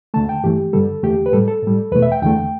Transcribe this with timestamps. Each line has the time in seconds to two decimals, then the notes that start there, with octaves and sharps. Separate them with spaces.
0.14 D2 D3 A3 A5
0.29 G5
0.43 G2 E3 A3 G4
0.73 G2 D3 G3 A4
1.03 E2 D3 A3 G4
1.26 B4
1.32 A2 G3 A4
1.48 A4
1.62 A2
1.67 G3
1.92 E2 B2 A3 B4
2.02 E5
2.12 G5
2.22 E2 D3 A3 G5